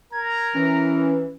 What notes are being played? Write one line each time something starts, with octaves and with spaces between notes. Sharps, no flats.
A#4 A#5 G#6
E3 C#4